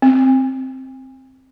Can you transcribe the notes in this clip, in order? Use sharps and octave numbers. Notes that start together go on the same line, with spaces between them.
C4